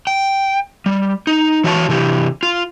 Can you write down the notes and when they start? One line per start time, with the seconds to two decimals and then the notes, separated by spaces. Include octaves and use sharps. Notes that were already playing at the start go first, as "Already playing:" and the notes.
0.07 G5
0.86 G3
1.27 D#4
1.64 E3 F#4 C#5 D#5 A5
1.89 C3 E3 G4
2.43 F4